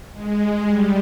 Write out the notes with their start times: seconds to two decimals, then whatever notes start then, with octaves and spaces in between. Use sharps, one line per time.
0.14 G#3
0.67 G3